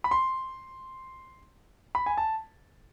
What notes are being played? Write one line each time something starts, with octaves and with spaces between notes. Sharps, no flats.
B5
C6
B5
G#5
A5